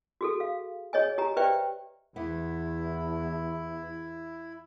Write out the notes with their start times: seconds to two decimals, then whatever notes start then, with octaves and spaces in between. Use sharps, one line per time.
0.21 F#4 G#4 A4
0.40 F5
0.93 G#4 C#5 D#5 G#5
1.18 G4 G#5 A#5
1.37 G4 B4 C5 D5 E5 G5
2.16 E2 E3 B3 E4